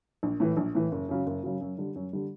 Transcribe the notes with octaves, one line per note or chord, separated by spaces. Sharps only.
A#1
A2 E3
A#1
A2 E3
F#1
F#2 C#3 F#3
F#1
F#2 C#3 F#3
F#2
D3 G3
F#2
D3 G3